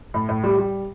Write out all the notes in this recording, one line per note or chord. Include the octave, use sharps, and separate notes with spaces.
A2
A2
G3
G3